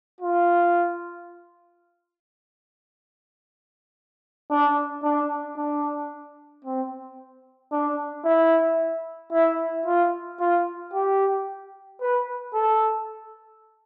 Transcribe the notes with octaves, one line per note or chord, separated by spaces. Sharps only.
F4
D4
D4
D4
C4
D4
E4
E4
F4
F4
G4
B4
A4